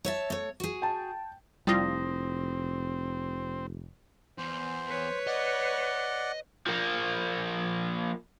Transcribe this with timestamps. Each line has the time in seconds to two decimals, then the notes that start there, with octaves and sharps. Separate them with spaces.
0.05 C#5 E5 A5
0.30 A3 C#5
0.60 F#4 G#4
0.82 G5 A5
1.67 F1 G3 C4 E4 F4 D#6 A#6
4.38 E2 C5
4.88 B4 C#5
5.27 D5 D#5 F#5
6.67 F3 A#3